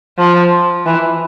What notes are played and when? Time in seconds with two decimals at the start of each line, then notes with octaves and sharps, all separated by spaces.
0.19 F3
0.86 E3